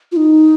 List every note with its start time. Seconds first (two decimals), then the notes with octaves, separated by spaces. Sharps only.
0.12 F4
0.17 D#4